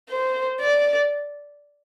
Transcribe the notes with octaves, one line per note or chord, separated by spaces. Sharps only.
C5
D5